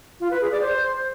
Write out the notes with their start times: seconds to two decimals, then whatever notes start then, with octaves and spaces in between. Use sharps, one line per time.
0.20 F4
0.31 B4
0.41 G#4
0.51 D5
0.62 C5